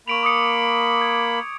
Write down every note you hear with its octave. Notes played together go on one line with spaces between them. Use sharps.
A#3 B5 C#6 D7 F7
D6 D#6 C#7
G#6